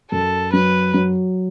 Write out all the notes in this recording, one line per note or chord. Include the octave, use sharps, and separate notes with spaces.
F#2 A4
F#3 B4
F#3